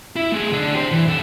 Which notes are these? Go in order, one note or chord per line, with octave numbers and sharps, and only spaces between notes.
E4
A3 G#4
D3 D4
G4 C5
E3
C#3 A4